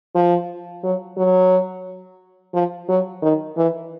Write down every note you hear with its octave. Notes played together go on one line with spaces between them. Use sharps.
F3
F#3
F#3
F3
F#3
D#3
E3